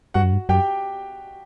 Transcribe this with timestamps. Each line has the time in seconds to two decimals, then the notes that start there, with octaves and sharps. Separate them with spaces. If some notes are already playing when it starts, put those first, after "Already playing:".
0.14 G2 F#4 F#5
0.23 F#2
0.32 G2
0.49 F#2 G4 G5